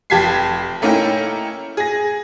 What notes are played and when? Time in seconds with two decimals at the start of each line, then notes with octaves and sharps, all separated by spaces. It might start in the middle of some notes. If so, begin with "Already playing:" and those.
0.10 F1 G4 A5 G#6 B6 C7
0.82 A3 A#3 C#4 D#4 E4 G5
1.77 G#4 A#6